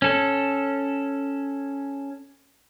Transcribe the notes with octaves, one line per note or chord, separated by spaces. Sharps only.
C#4 A4